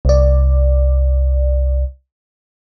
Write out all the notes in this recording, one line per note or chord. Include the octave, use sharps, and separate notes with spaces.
C2 D5